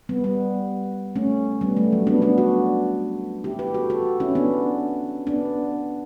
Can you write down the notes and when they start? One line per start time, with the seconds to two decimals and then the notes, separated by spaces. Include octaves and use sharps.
0.09 G3 B3
0.24 G3 B3
1.16 A3 C#4
1.61 G3 B3
1.77 A3
1.92 F#3
2.07 B3 D4
2.22 B3 D4
2.38 D4 F#4
3.44 E4 G4
3.59 G4 B4
3.74 F#4 A4
3.90 F#4 A4
4.20 C#4 E4
4.35 B3 D4
5.27 B3 D4